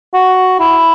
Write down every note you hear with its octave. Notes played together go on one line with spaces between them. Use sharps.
F#4
E4